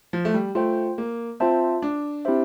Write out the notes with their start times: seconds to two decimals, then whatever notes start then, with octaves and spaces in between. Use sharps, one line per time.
0.13 F3
0.25 A3
0.34 G3
0.55 A3 F4 C5 G5
0.98 A#3
1.40 C4 F4 C5 E5 A5
1.82 D4
2.25 C4 E4 G4 C5 E5